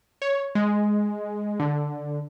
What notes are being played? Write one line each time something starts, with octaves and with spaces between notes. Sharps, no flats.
C#5
G#3
D3